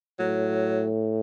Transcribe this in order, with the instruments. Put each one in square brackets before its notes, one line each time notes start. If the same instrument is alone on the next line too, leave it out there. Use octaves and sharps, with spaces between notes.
[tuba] A2 [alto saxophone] F#3